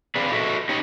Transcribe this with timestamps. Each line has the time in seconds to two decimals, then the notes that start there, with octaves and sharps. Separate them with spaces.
0.15 C4 G#4 B4 D5 F5
0.32 F#4 A4 D#5 E5
0.69 C#4 D#4 G4 C#5 D#5